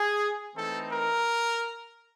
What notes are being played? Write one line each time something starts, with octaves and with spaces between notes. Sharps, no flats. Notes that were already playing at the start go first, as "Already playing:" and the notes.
Already playing: G#4
E3 A3 C4 D#4 A4
A#4